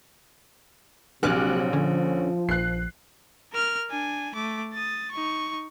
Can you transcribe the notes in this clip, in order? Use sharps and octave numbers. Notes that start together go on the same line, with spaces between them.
A#1 C3 F#3 G#5 D6 F6 F#6
D3 F3 C#4
A#1 F#6 C7
A#4 F6
D4 G#5
A3 D6
D#6 A6
D#4 C#6